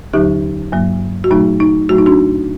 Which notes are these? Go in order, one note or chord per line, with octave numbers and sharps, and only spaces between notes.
D#2 D3 F#3 D#4 G4
G2 F#3 A#3
F#4
A#2 F#3 A3 D#4
D#4
A2 F#3 A3 F#4
D#4
D4 F#4